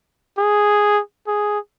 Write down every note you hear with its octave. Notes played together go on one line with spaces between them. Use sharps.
G#4
G#4